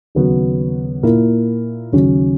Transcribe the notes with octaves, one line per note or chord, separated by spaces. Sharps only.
D#2 C#3 F#3 B3 F#4
A#2 A#3 E4 A#4
D#2 C#3 F#3 C#4 F#4